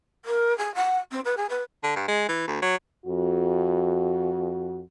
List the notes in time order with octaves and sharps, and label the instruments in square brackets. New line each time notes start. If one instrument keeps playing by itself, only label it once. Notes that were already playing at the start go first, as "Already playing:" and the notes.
[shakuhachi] A#4
G#4
F#5
C4
B4
G#4
B4
[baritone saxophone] D3
G2
G#3
E3
D2
F#3
[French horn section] F2 F#4